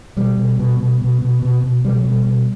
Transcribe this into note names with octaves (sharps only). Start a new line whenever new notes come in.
B2 G3
B2
B2
B2
B2
B2
B2
B2
B2 G3
F#3
B2 G3
B2